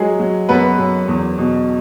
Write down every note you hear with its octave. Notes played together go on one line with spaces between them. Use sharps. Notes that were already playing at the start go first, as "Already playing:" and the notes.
Already playing: F#3 G#3 G#4
F#3
F#2 B3 B4
F#2
E2
B2